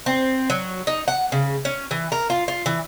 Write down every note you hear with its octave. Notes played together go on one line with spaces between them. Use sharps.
C4
F#3
D#4
F#5
C#3
C#4
E3
A#4
F4
F4
E3